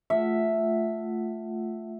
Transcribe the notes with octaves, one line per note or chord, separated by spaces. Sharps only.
A3 F4 E5 F#5